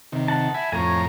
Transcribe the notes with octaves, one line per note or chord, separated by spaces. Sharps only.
C3 D#3
F#5 A5
E5 G#5 B5
F2 A2 C#5 G#5 A#5